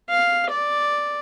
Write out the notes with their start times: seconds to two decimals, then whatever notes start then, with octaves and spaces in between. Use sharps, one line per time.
0.10 F5
0.51 D5